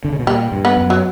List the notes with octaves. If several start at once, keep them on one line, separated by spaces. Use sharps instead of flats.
D3
C#3
B2
A#2 G3
G2
B3
F#2
F#3